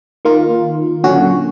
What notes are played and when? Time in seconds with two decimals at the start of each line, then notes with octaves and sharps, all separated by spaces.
0.25 D#3 A#3 F4
1.04 A#2 D3 F#3 C#4 F#4